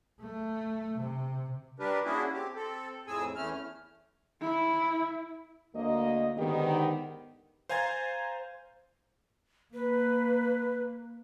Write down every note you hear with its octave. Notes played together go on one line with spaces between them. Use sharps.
A3
C3
G3 D4 G4 A#4 B4
A#3 C#4 D4 E4 F#4 G#4
C4 G4
C4 A4
F2 A2 C4 G#4 G#5 E6
E2 E3 A3 C#4 F6
E4
D2 A#3 D#5
G#2 D3 D#3 B3 D#4 G4
C5 F5 G#5 A#5 G#6 A6
A#3 B4